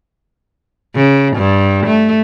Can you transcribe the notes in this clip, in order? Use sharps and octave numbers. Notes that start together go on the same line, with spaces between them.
C#3
G2
A3